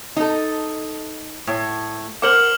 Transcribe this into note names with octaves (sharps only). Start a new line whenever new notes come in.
D#4 A4
A2
A#4 C5 F#5 D6 F6 F#7